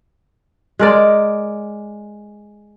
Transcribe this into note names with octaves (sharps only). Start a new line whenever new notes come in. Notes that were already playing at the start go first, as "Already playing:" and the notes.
G#3 A#4 D5